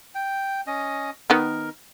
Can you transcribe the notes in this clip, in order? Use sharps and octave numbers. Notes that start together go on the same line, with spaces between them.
G5
C#4 D#5
D#3 B3 A#4